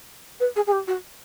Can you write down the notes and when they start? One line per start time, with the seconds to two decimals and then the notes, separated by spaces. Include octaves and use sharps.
0.40 B4
0.56 G#4
0.67 G#4
0.72 G4
0.87 F#4